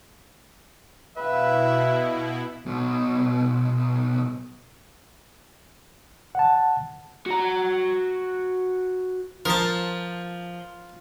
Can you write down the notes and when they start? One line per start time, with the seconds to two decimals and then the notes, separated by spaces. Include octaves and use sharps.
1.17 B2 E4 B4 E5 F5 G5
2.66 B1 B2
6.35 F#5 A5
7.26 F#4 A#5
9.45 F3 A#4 A5